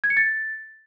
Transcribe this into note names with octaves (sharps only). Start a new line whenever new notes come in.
G#6
C#7
A6